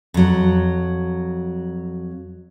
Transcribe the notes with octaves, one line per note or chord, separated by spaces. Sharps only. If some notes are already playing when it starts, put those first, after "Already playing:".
F2 F#3